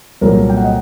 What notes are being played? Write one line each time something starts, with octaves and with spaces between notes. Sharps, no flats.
C2 A#2 F#3 A#3 A#4
A4
G5
F#5
D#5